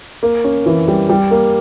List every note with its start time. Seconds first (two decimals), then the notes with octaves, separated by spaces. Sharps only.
0.23 A#3
0.44 C#4
0.66 E3
0.88 G3
1.09 G3
1.31 A#3